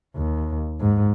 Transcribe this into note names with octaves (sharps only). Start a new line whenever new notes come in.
D#2
G#2